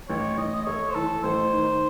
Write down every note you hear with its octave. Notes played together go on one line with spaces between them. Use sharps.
A1 C#5
A1 D#5
D#5
A3 C#5
C5
E3 A4
A1 C5
D#3